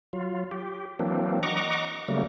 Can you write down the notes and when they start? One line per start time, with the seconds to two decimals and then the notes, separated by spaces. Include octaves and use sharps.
0.13 F#3 F4
0.51 G4
0.99 E3 F#3 A#3 C4 D4
1.43 D#5 F#5 A#5 C#6 D6
2.08 C#3 F#3 G3 A3 A#3